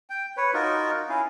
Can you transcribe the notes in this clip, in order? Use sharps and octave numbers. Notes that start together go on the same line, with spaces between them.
G5
B4 C#5
D#4 F4 F#4 A#4
C#4 E4 F5